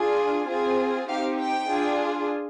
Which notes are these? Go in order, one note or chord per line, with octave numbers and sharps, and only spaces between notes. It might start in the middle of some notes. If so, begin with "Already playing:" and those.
Already playing: D4 F4 G#4
C4 F4 G#4
C4 D#4 G4 F5
G5
D4 F4 G#4